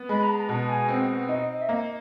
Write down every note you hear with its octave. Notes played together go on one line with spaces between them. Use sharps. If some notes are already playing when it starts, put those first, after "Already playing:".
Already playing: B3
G#3 B5
A#5
A5
A#5
B2 A5
G#5
C4 G5
F#5
D#4 D#5
D#5
E5
A#3 D#5
D#5